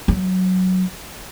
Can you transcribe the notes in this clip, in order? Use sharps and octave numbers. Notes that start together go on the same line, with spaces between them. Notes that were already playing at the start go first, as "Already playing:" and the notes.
F#3